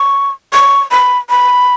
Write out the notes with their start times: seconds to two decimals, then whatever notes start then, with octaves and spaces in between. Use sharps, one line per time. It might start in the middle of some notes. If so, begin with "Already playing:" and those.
Already playing: C#6
0.53 C#6
0.91 B5
1.29 B5